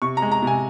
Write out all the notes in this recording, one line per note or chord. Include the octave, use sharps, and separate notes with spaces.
C3 C#6
A#5
G#3
A#5
C3 G#5